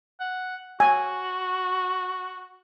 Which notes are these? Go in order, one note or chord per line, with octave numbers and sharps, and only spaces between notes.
F#5
F#4 G#5